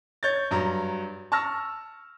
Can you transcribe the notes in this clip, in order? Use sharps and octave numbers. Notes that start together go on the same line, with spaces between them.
C#5 G6 A6
G2 F#3 A#5
A5 C#6 E6 F6 A#6